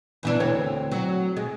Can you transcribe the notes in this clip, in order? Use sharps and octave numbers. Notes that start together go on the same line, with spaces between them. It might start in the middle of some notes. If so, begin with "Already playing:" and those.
E2 E3 D4
D2 C4 C#5
F#3
G#3